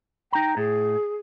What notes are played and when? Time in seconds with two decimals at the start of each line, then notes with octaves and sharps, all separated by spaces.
0.33 D#4 G5 A#5
0.57 A2 G#4